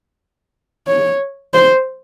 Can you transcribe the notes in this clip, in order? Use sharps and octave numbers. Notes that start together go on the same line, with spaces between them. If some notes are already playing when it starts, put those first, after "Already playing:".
C#5
C5